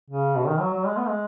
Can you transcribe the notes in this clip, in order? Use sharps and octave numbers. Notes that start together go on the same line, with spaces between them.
C#3
B2
D#3
F#3
F#3
G#3
B3
G#3